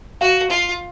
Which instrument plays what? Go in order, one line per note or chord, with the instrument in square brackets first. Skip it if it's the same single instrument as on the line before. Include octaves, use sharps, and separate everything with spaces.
[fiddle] F#4 [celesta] F5
[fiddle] F4